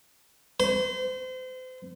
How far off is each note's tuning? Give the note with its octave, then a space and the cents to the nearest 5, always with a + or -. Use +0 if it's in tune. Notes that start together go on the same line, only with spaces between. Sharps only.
C5 -35